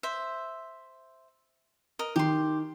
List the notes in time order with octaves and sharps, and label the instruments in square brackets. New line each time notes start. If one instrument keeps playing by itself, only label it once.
[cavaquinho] C5 E5
A#4 D#5
[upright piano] D#3 [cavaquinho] G4 C6